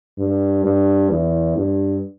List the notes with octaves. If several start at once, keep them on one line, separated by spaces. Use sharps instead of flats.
G2
G2
E2
G2